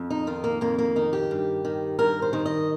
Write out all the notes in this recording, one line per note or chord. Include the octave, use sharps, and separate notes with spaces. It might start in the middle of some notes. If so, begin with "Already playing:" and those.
Already playing: F2
D#4
D#3 F4
A#3
F2 A#3
A#3
D#3 D#4
G4
G2
D#3
G2 A#4
C5
D#3
D#5